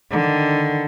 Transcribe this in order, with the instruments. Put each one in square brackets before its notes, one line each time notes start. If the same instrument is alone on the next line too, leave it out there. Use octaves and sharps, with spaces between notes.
[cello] D3 D#3